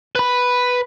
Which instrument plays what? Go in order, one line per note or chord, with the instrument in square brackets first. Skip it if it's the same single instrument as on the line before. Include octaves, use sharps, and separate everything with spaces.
[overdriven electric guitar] B4 B5